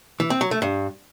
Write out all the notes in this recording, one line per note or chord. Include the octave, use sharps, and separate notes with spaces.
E3
C4
F#3
A3
G2